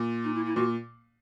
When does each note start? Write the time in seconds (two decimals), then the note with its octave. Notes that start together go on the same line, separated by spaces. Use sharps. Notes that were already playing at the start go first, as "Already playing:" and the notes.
Already playing: A#2
0.24 D#4
0.34 E4
0.46 E4
0.56 A#2 F#4